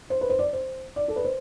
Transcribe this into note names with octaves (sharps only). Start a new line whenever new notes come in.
C5
B4
C5
D5
C5
D5
A4
B4
C5